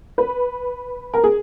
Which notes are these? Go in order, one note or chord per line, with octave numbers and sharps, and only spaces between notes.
B4
A#4
G#4